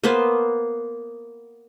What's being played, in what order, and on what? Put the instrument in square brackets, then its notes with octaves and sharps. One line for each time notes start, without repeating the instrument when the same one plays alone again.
[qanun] A#3 B3 B4 C5